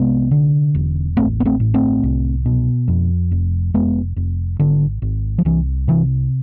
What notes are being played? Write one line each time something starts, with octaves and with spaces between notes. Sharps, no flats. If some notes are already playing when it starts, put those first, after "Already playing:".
Already playing: C2 C3 G#3 B3
D3
E1
A1 A3 C4
B3
A3 C4
A2
A3 C4
C2
B2
F2
F1
F1 G#3 B3
F1
G#1 D3
G#1
F3
C2 E3
C3 E3